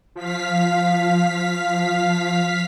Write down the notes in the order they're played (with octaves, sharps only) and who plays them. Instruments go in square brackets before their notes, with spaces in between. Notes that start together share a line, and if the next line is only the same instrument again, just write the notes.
[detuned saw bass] F3 [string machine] F5 B6